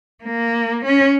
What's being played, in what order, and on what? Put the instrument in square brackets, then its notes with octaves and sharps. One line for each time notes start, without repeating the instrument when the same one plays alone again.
[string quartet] A#3
C#4